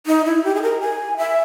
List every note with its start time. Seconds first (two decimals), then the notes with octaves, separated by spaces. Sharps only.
0.06 D#4
0.25 E4
0.44 G4
0.55 G#4
0.62 A#4
0.81 G#5
1.17 E5